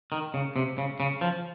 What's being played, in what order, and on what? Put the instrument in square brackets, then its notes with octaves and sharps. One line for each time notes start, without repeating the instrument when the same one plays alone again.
[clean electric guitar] D#3
C#3
C3
C#3
C#3
F3